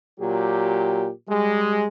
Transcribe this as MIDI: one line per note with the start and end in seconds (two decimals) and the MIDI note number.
0.20 1.10 46
0.20 1.10 54
0.20 1.10 67
1.28 1.86 55
1.28 1.86 56